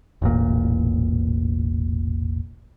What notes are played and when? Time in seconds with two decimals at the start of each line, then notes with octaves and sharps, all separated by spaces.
0.22 E1 A1 A#2